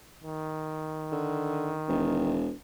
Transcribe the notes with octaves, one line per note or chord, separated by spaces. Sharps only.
D#3
D3
E1